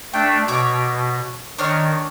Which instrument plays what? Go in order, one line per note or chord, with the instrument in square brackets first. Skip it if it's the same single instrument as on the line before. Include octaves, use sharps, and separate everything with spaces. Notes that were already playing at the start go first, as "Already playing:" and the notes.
[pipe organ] A3 D4 [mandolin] G5
[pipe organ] B2 [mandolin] C#5 D6
[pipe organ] D#3 [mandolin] D4 C#5 F6